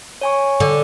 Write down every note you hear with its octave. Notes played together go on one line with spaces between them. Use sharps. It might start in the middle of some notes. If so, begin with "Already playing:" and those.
C#5 G#5 C#6
D3